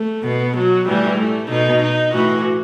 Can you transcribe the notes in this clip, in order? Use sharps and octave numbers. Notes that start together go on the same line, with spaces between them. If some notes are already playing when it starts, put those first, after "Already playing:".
Already playing: A3
B2 B3
F#3
A2 E3 G3
A3
B2 D#4
D#4
A2 E3 F#4